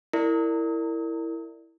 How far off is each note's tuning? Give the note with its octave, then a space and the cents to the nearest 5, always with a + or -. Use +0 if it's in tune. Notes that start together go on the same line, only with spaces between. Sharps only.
E4 +0 A#4 -25 D5 +0